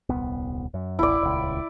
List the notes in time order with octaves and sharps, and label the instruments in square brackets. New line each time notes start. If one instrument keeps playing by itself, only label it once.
[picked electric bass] D#1 C2 B3
F#2
[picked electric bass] D#1 A1 [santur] E4 D5
[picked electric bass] D#1 C#2